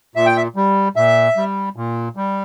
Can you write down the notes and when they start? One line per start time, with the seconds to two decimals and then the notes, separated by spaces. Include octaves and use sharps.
0.15 A#2 E5
0.26 G5
0.37 E5
0.56 G3
0.96 A#2 E5
1.37 G3
1.76 A#2
2.17 G3